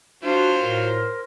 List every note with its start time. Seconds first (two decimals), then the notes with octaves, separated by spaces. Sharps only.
0.23 F#3 D4 F4 F#4 C5
0.61 A2 A#4